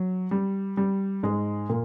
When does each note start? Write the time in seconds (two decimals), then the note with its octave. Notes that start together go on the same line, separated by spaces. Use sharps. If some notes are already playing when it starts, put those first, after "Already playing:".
Already playing: F#3
0.31 G3
0.77 G3
1.23 G#2 G#3
1.69 A#2 A#3